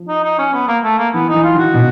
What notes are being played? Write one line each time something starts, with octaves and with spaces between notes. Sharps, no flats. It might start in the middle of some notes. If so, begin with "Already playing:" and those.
Already playing: F3
D#4
D#4
C#4
B3
A#3
A3
A#3
E3 B3
E3 D#4
F4
D#3 F#4
B2